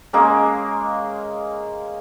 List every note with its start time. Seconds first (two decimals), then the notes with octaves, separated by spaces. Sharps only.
0.13 G#3 A#3 C#4